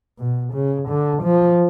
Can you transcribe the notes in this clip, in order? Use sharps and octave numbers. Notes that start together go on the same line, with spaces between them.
B2
C#3
D3
F3